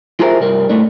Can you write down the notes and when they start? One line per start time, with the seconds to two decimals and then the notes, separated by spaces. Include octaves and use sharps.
0.20 F4 G4 G#4 A#4 C5 E5
0.40 C2 G2 G3 A#4
0.70 A2 A3 D4